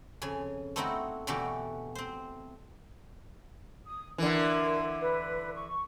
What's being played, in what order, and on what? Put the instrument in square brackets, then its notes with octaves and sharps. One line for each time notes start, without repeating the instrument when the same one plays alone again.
[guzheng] F2 C#3 G#5
A3 B3 C4 D#4 E4 F#4
B2 D3 E3 A3 F#4 G4
C4 C5
[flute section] D#6
[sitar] D3 E3 [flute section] A#4
[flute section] B4
C#6